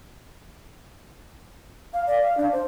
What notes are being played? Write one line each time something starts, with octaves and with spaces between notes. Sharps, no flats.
F5
D5
F5
D4
C5